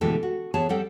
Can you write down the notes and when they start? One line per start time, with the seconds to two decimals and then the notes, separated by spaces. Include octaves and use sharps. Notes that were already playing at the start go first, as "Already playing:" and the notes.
0.01 D2 B2 E3 G#3 G4 A4
0.23 F#4
0.54 E3 B3 G#4 C#5 A5
0.69 G3 C4 A4 F#5 G5